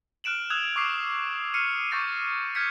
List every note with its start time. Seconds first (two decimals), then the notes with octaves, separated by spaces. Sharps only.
0.24 F6 F#6 D7 E7 F#7
0.50 D#6 E6 F#6 G#6 F7
0.76 C#6 D6 E6 C7
1.54 F6 C7 C#7 D#7
1.91 C#6 D6 G6 A6 A#6 D#7
2.55 F6 G6 G#6 B6 C#7